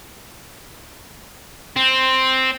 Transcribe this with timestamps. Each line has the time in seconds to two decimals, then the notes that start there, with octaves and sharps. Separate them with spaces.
1.76 C4